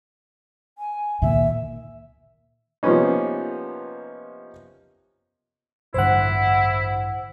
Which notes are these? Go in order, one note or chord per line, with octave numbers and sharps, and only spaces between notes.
G#5
A#2 D#3 E5
C3 F3 A#3 B3 C#4 D#4
A1 G2 D3 E4 C5 F#5